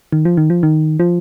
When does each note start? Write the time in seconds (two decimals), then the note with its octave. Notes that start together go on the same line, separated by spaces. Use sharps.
0.13 D#3
0.25 F3
0.37 D#3
0.50 F3
0.63 D#3
1.00 F3